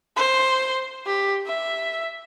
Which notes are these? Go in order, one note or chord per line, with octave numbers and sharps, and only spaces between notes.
C5
G4
E5